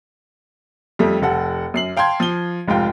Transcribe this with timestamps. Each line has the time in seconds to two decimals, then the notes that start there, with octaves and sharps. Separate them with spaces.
0.99 F2 G3 A3
1.22 F1 A4 F#5
1.74 F#2 C7 F#7
1.97 F5 G5 A5 C6 G#6
2.20 F3 G7
2.68 F1 G#2 F4 G5